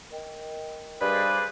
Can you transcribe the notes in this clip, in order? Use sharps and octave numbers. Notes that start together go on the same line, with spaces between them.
A#4 D#5 G5
G2 G#4 B4 C5 D5